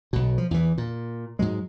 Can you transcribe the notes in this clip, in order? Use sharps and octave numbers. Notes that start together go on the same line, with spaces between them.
B1 B2
F3
E2 E3
A#2
G#2 F#3 G#3